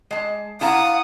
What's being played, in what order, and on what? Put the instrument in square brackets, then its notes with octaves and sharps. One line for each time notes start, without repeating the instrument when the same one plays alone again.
[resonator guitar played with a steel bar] G#3 A5
[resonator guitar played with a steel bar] E4 A5 A#5 [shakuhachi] F5 [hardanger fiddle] F#5 D#6